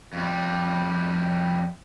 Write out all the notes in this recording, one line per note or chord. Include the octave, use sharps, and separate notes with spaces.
F2 G3